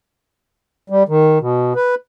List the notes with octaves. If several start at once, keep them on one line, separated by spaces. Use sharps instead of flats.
G3
D#3
B2
B4